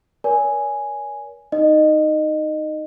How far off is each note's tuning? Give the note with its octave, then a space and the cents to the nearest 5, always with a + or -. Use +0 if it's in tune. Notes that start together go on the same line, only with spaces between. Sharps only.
A#4 +40 C#5 +45 G#5 +0
D#4 +0 D#5 -20